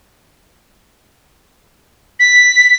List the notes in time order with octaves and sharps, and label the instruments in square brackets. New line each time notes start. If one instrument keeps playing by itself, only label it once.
[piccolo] B6